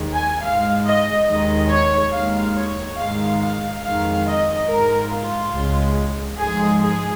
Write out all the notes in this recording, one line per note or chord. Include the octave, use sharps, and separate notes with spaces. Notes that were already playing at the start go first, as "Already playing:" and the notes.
Already playing: D#2 D#3 G#3
G#5
G#2 G#3 F5
D#5
D#2 D#3 G#3 D#5
C#5
D#2 D#3 G#3 F5
C#5
G#2 D#3 G#3 F5
F5
F2 D#3 G#3 F5
D#5
G#2 G#3 A#4
F4
C#2 C#3 G#3
G#2 F3 G#3 G#4
G#4